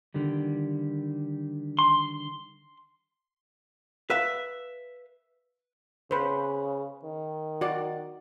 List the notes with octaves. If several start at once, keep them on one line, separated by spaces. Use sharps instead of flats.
D3 D#3 G3
C6
B4 E5 F5
C#3 B4 C5
D#3
F#4 D5